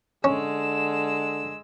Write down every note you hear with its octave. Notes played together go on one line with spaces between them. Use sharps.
D3 G#3 C#4 E6